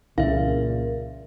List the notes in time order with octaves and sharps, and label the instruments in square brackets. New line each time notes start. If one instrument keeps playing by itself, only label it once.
[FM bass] C2 [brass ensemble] A#2 [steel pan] C#3 E3 [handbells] E5 F5